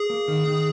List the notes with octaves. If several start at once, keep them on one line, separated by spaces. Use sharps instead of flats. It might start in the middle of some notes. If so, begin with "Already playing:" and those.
Already playing: G#4
A#3
D#3
D#3